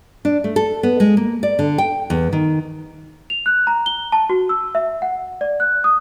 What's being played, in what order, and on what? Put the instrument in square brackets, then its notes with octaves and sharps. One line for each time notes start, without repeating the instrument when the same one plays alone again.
[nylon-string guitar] D4
A3
A4
B3
G#3
A#3
D5
D3
G5
E2
D#3
[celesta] F7
F#6
A#5
G7
A5
F#4
E6
E5
F#5
D5
F#6
D#6